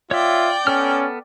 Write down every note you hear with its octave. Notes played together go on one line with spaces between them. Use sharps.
F4 C#5 D5 E5 G5
B3 C#4 A4 F6